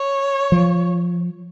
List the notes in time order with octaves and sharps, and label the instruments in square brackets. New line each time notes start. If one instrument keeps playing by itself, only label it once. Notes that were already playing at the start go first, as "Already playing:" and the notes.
Already playing: [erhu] C#5
[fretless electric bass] F3